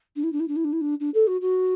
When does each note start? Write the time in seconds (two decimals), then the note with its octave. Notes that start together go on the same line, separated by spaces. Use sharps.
0.16 D4
0.24 E4
0.32 D4
0.40 E4
0.48 D4
0.56 E4
0.64 D4
0.73 E4
0.81 D4
1.00 D4
1.14 A4
1.27 F#4
1.41 F#4